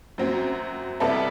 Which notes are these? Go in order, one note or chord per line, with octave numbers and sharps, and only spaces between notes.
F#2 F#3 C4
C3 G3 B3 E4 A4